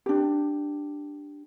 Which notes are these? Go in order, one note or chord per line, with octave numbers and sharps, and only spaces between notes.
D4 G4